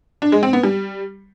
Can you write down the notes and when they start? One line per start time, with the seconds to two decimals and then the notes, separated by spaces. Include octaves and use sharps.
0.22 D4
0.32 G#3
0.43 C4
0.53 B3
0.63 G3